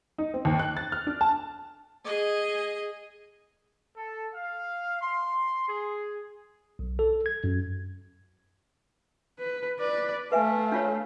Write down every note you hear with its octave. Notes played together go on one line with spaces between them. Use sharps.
D#4
C4
D#2
F#6
A6
F6
D4
A5
G#4 D#5
A4
F5
C6
G#4
B1
A4
G#6
F#2
B4
B4 D5
A3 B4 E5 F5 G#5
D4 F4 C#5